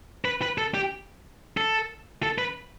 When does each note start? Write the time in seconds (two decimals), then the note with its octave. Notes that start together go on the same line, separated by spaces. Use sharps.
0.25 B4
0.42 B4
0.58 A4
0.74 G4
1.57 A4
2.23 A4
2.38 B4